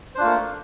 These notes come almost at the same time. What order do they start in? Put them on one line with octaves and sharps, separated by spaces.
C5 D4 F4 A#3 A3